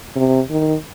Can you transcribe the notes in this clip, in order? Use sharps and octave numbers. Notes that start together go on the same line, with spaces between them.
C3
D#3